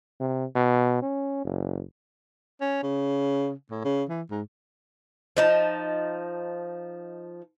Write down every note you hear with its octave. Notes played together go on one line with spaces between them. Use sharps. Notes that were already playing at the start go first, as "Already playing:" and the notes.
C3
B2
C#4
F#1
C#4
C#3
A2
C#3
E3
G#2
F3 D#4 A5